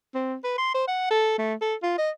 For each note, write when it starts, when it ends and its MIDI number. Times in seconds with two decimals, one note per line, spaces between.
0.15 0.36 60
0.44 0.57 71
0.58 0.71 84
0.74 0.85 72
0.88 1.07 78
1.11 1.36 69
1.38 1.54 57
1.61 1.75 69
1.82 1.93 65
1.98 2.10 75